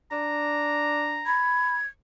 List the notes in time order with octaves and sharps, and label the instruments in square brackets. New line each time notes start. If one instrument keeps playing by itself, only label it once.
[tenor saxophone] D4 [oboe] A#5
[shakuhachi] B5 [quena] G#6